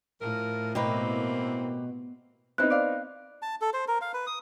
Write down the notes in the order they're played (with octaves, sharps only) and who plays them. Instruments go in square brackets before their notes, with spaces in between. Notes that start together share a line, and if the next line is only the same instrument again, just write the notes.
[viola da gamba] A2 [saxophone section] F3 A#4
[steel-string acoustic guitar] B2 [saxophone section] E3 A#3 C4 [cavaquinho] G4 A#4 B4
[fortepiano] B3 C4 D#4 [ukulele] E4 C5 [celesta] F#6
[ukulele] D5 F5
[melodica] A5
A4
C5
A#4
F5
B4
D#6